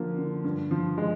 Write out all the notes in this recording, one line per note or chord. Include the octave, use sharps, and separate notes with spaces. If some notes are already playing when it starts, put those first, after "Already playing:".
Already playing: D3 F3 A#3
D3
G2
F3
G#3